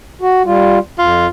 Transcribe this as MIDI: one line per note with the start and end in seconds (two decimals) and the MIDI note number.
0.22 0.42 66
0.46 0.79 55
0.46 0.79 65
0.99 1.27 41
0.99 1.27 65